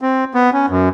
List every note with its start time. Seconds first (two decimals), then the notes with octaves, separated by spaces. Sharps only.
0.01 C4
0.34 B3
0.53 C#4
0.69 F#2